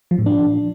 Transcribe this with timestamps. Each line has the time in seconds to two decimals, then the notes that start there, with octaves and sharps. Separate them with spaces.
0.11 F3
0.19 A2
0.26 D4